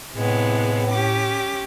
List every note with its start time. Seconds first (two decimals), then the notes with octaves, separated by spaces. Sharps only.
0.15 A2 C3 G#3 B3
0.90 C#4 G4 D6